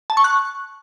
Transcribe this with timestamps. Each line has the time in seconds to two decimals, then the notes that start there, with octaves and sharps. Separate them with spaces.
0.10 A5
0.17 C#6
0.24 F#6